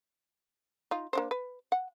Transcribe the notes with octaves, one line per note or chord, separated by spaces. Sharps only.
D#4 F4
A#3 D4 C5
B4
F#5